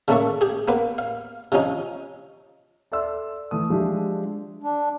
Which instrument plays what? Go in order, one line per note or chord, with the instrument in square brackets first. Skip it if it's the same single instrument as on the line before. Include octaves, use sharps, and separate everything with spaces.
[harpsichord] C#3 A3 A#3 D5 E5 C#6
G4 G#4
A#3 B3 B4
F5
C3 F3 C#4 D#4
[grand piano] A4 D5 E5 C6 E6
E3 A3 D#6
F3 G#3 D4 G4 E5
[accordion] D4